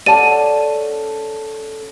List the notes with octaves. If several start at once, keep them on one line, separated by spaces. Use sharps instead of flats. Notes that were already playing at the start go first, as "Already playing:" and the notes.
C#4 A4 D5 F#5 A5 D#7